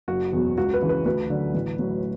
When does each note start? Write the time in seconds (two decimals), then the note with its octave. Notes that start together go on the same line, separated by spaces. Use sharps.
0.08 F#1 F#4
0.33 E2 B2 F#3
0.58 C#2 F#4
0.74 B4
0.81 C#3 E3
0.89 B4
1.06 D2 B4
1.30 D3 F#3
1.54 A1
1.79 A2 F#3